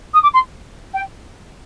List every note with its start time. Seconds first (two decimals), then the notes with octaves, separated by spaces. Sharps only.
0.13 D#6
0.23 D6
0.34 C6
0.94 G5